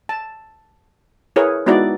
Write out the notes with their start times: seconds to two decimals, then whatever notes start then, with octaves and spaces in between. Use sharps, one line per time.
0.09 A5
1.36 E4 G#4 A#4 B4 C#5
1.66 G#3 B3 D#4 E4 F#4 D5